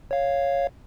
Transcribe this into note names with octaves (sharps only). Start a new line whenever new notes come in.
C#5 F5